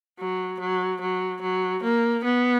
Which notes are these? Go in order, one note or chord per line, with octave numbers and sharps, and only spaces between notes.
F#3
F#3
F#3
F#3
A#3
B3